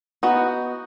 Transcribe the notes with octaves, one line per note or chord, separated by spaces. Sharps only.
B3 D#4 F#4